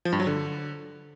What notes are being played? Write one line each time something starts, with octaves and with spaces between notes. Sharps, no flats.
F3
G2
F#3
D3